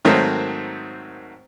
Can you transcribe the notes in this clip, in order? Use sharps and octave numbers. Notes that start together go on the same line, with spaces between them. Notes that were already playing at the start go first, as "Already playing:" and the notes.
G#2 D#3 F#3 A3 A#3 C4